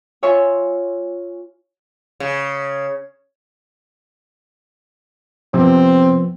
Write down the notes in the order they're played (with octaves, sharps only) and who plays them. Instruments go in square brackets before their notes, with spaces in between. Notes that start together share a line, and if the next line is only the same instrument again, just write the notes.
[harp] F4 C#5 E5 G#5 C6 C#6
[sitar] C#3
[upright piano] C3 [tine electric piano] F3 B3 [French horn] C4